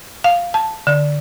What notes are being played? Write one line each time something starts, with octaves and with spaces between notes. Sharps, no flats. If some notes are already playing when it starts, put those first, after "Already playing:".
F5
A5
D3